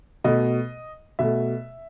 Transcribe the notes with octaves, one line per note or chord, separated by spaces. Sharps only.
B2 A3 D#5
B2 A3 E5